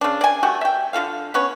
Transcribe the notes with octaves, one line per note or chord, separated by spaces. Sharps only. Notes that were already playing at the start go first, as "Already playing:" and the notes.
C#3 D4
D5 G#5
A3 F#4 G4
E5 G5
D3 F4 A4 F5
B3 C#4 B4 C#5